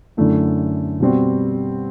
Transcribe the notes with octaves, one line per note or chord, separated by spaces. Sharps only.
F#2 D3 A3 E4
B2 G3 C4 F#4